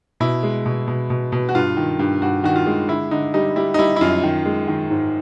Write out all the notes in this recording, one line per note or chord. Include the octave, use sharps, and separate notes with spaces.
B2 E4
G#3
B2
B2
B2
B2
F#4
G2 F4
D#3
G2
G2 F#4
D#3 F#4
F4
G#3
D3 E4
D3 D#4
G3 D#4
G3 E4
D#4
G3 E4
E4
F#2 F4
D#3
G#3
D#3
G#2